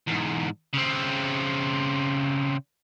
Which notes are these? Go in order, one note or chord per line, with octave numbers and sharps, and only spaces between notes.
E2 G#2
C#3 C4